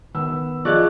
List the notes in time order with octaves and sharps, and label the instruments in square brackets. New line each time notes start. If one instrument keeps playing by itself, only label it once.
[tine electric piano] D#3 [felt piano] B3 E6
[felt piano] F3 G#6 [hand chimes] F4 G#4 D#5 [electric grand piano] D5 C#6 F#6